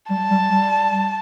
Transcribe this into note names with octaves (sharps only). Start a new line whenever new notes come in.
G3 A5
G3
G3